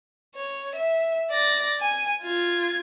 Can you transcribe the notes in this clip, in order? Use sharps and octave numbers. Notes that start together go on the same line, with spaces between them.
C#5
E5
D5 A#6
G#5
F4 G#6